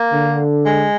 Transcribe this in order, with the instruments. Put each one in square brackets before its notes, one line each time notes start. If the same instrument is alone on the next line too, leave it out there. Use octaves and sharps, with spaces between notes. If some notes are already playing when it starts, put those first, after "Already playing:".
Already playing: [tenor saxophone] A#3
[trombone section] D3
[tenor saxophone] G#3